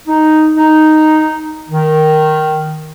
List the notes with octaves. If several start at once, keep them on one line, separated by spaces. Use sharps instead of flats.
D#4
D#4
D#3